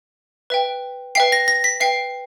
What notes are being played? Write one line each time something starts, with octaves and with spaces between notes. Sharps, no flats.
B4 E5 G5
B4 E5 G5 C7
A#6
A#6
B6
B4 E5 G5 C7